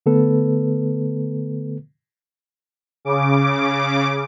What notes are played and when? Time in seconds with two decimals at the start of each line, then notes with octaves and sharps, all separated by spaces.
0.06 D3 A3 B3 A4 B4
3.05 C#3 D6